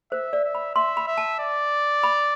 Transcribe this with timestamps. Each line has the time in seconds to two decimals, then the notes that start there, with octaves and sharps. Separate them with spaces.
0.11 C5 E5
0.33 D5
0.44 E5
0.55 B5
0.75 E5 C6
0.97 B5
1.08 E5
1.18 A5
1.40 D5
2.03 B5